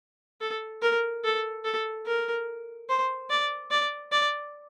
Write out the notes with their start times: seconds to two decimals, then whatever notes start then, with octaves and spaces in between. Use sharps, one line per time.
0.41 A4
0.82 A#4
1.24 A4
1.64 A4
2.06 A#4
2.89 C5
3.30 D5
3.71 D5
4.12 D5